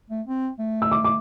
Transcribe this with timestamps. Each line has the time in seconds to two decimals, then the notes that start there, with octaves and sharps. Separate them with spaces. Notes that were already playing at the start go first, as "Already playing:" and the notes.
0.10 A3
0.27 C4
0.59 A3
0.82 E6
0.92 D6
1.04 D6